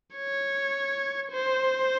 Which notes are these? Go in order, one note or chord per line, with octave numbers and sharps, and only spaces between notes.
C#5
C5